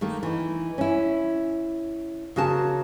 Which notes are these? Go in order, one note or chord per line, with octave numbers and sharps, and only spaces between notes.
D#3 A3 A#3
E3 D#4
C#4 E4
C#3 A#3 F#4 A#4 A5